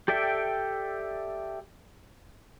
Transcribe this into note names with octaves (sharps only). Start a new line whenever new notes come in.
G4 A4 D5 E5 G5